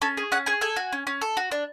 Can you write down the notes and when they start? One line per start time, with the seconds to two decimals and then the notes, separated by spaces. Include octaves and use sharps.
0.02 C#4 A4
0.17 G#4
0.32 C#4 F#5
0.46 G#4 G#5
0.61 A4 G#5
0.76 F#4
0.92 C#4
1.07 C#4
1.21 A4
1.37 F#4
1.51 D4